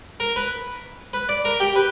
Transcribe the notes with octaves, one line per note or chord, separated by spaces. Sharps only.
A#4
B4
B4
D5
A#4
G4
B4